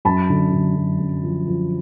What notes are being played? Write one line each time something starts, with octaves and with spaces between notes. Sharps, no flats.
F#2 A5 B5
D3
D3
F#2
F#2
F3
F3